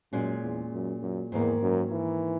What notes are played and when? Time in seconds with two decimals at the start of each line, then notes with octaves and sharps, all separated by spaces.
0.12 F#2 A#2 G#3 C#4
0.43 E2
0.72 F#2
1.02 F#2
1.32 E2 G#2 D#3 A#3
1.62 F#2
1.92 E3